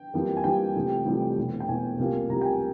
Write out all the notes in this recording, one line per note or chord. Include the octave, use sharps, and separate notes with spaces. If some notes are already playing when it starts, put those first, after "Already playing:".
Already playing: G5
F2 E3 G3 A#3
G#5
F2 E3 G3 A#3 G5
F1 F2 E3 G3
F1 F2 E3 G3
E1 E2 E3
G5
E1 E2 E3 G#5
C2 C3 F3 A#3
C2 C3 F3 A#3 A#5
G5
G#5